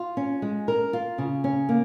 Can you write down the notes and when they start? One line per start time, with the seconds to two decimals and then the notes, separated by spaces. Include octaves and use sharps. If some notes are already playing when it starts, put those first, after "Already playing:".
Already playing: F4
0.17 C#4
0.42 G#3
0.68 A#4
0.93 F4
1.18 C#3
1.44 C#4
1.69 A#3